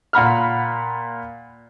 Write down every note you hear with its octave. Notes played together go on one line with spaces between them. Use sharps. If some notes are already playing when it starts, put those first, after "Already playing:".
A#2 F#5 B5 F6